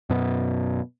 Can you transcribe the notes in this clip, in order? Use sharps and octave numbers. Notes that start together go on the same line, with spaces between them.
F#2 B2